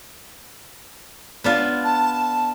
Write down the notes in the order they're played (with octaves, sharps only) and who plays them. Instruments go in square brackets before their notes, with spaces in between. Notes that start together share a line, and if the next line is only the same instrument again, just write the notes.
[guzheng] B3 D4 F4
[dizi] A5